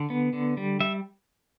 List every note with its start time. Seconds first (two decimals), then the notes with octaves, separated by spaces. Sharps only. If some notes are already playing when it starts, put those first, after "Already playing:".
Already playing: D3
0.10 B3
0.33 D3
0.57 G3
0.80 G3 E5